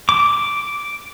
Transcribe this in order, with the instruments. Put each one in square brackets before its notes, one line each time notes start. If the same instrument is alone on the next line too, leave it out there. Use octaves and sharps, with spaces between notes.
[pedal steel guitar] D6